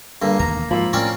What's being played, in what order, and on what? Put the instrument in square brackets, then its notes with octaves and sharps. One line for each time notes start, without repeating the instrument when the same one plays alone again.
[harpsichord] G2 D3 [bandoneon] A#3
[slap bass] E1 D#2 C3 [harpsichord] A#5
[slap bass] G#2 G#3 [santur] F3 E6 [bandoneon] A#3 B5
[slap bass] A2 [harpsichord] C4 C#4 D5 [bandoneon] A#4